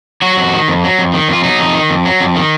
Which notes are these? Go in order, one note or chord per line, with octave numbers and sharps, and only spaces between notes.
F#3 F#4
F2
D#3
F2
F#3
F2
D#3
F2 F4
F#3 D#4
F2
D#3
F2
F#3
F2
D#3